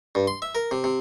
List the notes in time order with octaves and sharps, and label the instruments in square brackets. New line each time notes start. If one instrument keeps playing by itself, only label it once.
[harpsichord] G2
C6
E5
A#4
C3
C3